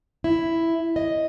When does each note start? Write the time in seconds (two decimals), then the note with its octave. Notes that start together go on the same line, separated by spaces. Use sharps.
0.24 E4
0.96 D#5